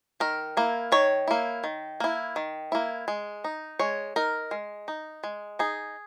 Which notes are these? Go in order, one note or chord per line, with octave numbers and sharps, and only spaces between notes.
D#3 A#4
A#3 E4
D#3 C#5
A#3 E4
D#3
A#3 E4
D#3
A#3 E4
G#3
D#4
G#3 C#5
D#4 A#4
G#3
D#4
G#3
D#4 G#4